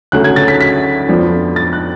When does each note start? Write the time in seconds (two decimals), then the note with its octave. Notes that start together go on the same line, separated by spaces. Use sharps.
0.12 D2 C#3 F#3 A3 F#6
0.24 G#6
0.36 A6
0.48 B6
0.61 B6
1.09 F2 F3 B3 D4
1.56 A6
1.73 F#6